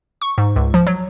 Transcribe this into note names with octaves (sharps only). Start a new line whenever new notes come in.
C#6
G#2
C#2
F3
F#3